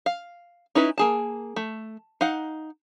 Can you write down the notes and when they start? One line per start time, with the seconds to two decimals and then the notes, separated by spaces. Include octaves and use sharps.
0.06 F5
0.75 C#4 D#4 E4 B4
0.98 A#3 G#4 A5
1.56 A3
2.21 D#4 F5 F#5